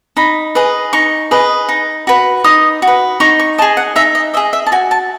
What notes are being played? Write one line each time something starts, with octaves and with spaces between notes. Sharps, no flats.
D#4 B5
G#4 B4 D#5
D#4 C#6
G#4 B4 D#5
D#4
F#4 B4
D#4 D#6
F#4
B4
D#4 C#6
C#6
G#4 D#5 A5
F#5
D#4 E5
D#5
G#4 D#5 E5
E5
A5
F#4 G#5
A5